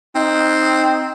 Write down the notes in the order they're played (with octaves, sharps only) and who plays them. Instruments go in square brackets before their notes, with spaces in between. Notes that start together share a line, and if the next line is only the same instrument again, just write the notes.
[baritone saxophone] C4 [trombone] D#4